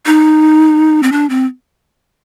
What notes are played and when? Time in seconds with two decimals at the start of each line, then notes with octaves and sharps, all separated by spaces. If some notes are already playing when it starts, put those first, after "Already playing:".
0.06 D#4
1.03 C4
1.12 D4
1.30 C4